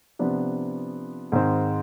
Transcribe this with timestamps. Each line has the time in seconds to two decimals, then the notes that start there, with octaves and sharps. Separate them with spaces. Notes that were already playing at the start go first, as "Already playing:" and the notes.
0.19 C3 F3 B3 D4
1.32 G#2 D#3 G#3 C4